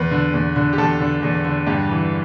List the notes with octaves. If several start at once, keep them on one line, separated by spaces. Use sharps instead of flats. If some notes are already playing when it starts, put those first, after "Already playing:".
Already playing: E2 B4
D3
E2
D3
G4
E2 A4
D3
E2
D3
G2 G4
E3